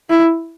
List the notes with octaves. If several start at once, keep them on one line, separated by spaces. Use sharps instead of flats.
E4